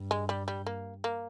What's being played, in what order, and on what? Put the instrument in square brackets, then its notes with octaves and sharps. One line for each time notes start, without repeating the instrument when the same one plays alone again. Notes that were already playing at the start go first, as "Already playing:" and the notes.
Already playing: [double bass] G2
[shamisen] G#3
G3
G3
A#3
A#3